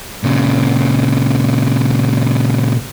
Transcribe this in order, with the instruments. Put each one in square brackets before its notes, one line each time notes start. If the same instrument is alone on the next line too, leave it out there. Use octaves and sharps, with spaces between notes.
[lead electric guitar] A#2 C#3